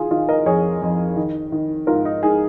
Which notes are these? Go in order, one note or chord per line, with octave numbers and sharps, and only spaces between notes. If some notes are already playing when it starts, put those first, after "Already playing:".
Already playing: D#3 F4 G#4
D#3 F4
A#4 D#5
F2 G#4 C#5
F2
D#3
D#3
G#2 F4 A#4
D#4
G#2 D#4 G#4